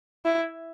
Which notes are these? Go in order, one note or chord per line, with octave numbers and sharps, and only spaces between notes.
E4